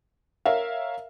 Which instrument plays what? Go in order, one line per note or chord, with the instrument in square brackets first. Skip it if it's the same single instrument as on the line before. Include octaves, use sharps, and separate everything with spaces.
[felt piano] A#4 C#5 E5 F5